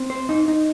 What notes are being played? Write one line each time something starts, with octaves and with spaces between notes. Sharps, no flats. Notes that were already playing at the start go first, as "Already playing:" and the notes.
Already playing: C4
C5
D#4
D#4